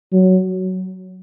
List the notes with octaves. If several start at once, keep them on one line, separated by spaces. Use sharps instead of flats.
F#3